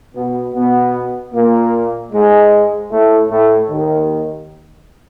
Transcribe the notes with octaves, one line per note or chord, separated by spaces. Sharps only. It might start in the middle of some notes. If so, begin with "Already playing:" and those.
B2 B3
B2 B3
A#2 A#3
G#2 G#3
A2 A3
A2 A3
D#2 D#3